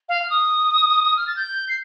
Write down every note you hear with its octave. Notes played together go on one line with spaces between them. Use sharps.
F5
F6
D#6
F6
A6
G6
C7